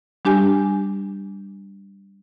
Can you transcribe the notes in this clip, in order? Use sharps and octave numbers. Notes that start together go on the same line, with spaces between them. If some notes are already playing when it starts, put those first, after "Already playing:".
G3 D4 G4 G#5